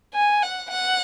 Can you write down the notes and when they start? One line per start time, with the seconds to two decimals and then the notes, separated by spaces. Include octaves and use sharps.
0.14 G#5
0.43 F#5
0.71 F#5